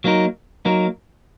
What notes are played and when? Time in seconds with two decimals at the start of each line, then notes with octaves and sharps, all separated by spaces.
0.04 F#3 A#3 D#4 A#4
0.65 F#3 A#3 D#4 A#4